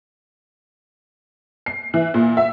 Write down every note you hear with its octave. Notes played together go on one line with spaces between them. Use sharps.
C7
E3
A#2
E5